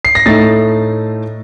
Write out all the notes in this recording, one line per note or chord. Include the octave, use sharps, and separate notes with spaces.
C7
A#6
A2 A3 D#4 A6